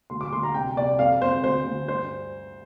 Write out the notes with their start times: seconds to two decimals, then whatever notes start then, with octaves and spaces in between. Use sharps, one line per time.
0.10 D2 C6
0.21 D6
0.32 D2 C6
0.43 A#5
0.54 C2 G5
0.77 C2 D5
0.99 F2 F5
1.21 F2 C5
1.43 D2 C5
1.66 D2
1.88 G2 C5